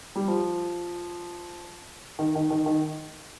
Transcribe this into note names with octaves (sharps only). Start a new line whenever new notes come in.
G3
F3
D#3
D#3
D#3
D#3